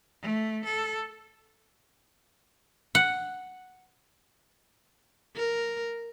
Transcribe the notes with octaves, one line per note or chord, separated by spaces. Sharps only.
A3
A4
F#5
A#4